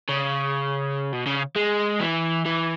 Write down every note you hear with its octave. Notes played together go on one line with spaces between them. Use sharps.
C#3
B2
C#3
G#3
E3
E3